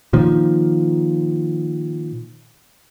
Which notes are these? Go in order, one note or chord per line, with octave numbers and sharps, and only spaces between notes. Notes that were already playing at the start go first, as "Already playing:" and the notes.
A#2 D#3 F3